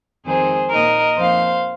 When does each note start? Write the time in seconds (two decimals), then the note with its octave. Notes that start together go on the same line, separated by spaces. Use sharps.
0.25 F2 D#3 G#3 C4 D#4 G#4 C5
0.71 A#2 A#3 D#4 A#4 D#5
1.17 F2 F3 A#3 D#4 C5 F5